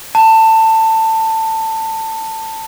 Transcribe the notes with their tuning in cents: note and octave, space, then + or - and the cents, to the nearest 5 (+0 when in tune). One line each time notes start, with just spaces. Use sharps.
A5 +20